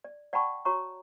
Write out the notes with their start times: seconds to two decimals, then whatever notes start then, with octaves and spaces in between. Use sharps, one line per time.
0.04 D5
0.33 D5 F#5 G5 A5 B5 C#6
0.65 F#4 C#5 A#5 C#6